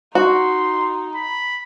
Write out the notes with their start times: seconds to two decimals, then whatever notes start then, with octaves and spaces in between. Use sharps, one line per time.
0.15 D#4 F#4 C6
1.14 B5